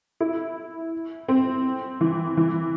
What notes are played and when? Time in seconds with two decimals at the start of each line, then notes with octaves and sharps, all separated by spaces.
0.21 E4
1.28 C4
2.01 E3
2.37 E3